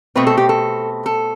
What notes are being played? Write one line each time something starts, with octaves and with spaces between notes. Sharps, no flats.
B2 A3 C4 B4
A4
G4
A4
A4